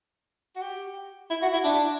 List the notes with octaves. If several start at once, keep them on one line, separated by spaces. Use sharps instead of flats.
F#4
G4
E4
F#4
E4
D4